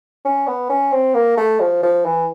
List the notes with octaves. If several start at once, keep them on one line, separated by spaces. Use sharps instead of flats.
C#4
B3
C#4
C4
A#3
A3
F3
F3
E3